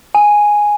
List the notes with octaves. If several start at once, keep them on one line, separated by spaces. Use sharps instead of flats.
G#5